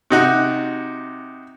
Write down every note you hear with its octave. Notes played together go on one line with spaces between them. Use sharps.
C3 D#4 F#4